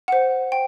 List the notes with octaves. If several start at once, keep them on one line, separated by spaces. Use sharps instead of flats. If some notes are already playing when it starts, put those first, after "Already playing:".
C5 F#5
G5